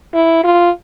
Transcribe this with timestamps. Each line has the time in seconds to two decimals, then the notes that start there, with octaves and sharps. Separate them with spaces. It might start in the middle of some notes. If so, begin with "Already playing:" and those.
0.14 E4
0.44 F4